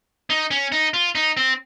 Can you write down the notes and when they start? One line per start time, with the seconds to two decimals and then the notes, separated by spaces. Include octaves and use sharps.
0.30 D#4
0.51 C#4
0.72 D#4
0.94 F4
1.15 D#4
1.37 C4